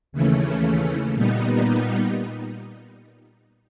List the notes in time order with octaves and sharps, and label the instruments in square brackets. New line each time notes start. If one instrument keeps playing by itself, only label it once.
[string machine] D#2 C#3 E3 A3 C#4
A#2 G3 B3 D#4